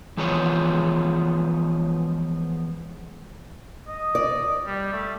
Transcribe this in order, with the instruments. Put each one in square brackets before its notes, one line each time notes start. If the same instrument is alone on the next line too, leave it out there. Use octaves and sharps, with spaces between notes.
[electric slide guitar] E3 F3 G#3 B3 C#5
[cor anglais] D#5
[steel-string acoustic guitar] D5
[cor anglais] G3
A3